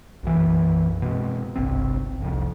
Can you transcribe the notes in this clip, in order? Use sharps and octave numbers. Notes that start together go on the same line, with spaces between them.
B1 F#2 E3
B2 G#3 C4
G1 C2 C4
F1 C2 F2